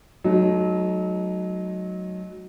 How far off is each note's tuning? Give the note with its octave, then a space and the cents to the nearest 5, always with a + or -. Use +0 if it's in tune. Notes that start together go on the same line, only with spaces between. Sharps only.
F#3 +0 A3 -35 D#4 +0